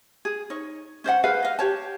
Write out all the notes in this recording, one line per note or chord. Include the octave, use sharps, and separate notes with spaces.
G#4
D#4 C#5
C#4 C5 D5 F#5
G#4 B4 F5
D#5 F5
G4 C#5 A5